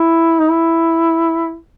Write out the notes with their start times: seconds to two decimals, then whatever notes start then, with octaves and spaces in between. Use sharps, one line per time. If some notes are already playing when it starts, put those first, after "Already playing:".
Already playing: E4
0.40 D#4
0.50 E4